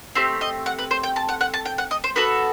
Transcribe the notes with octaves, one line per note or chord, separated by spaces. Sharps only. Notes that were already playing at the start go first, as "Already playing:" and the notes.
A3 C4 G4 C5
D#5
F#5
B4
C5
G5
A5
F#5
F#5
A5
G5
F#5
D#5
C5
B3 F#4 A4 B4